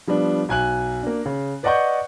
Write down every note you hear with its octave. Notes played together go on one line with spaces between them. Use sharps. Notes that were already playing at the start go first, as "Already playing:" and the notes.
F3 G3 B3 D4
B1 G#5 F#6 F#7
A#3 D4
C#3
B4 D5 D#5 F#5 C#6 G6